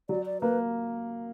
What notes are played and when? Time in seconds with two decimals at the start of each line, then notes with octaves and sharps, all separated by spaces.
0.09 F#3 D5
0.26 D5
0.41 A#3 B4